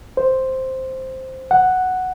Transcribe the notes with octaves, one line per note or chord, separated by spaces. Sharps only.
C5
F#5